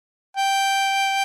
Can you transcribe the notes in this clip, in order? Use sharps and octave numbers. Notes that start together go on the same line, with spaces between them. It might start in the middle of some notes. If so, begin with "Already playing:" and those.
G5